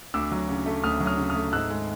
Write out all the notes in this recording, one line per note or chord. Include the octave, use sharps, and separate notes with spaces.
D2 D6 E6
F#3
C#3
A3
D2 D#6 F6
F#3
D#6 F6
C#3
D#6 F6
A3
G#2 E6 F#6
G#3